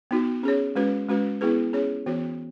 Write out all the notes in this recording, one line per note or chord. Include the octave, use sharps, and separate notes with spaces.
B3 D#4 F#4
C#4 G#4 C#5
G#3 C#4 F#4 B4
G#3 C#4 F#4 B4
B3 E4 G#4 B4
C#4 G#4 C#5
E3 B3 F#4 C#5